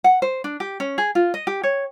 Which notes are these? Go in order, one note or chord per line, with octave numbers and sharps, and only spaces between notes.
F#5
C5
D4
G4
C#4
G#4
F4
D#5
G4
C#5